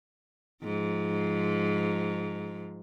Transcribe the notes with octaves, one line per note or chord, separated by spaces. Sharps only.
G#2 F3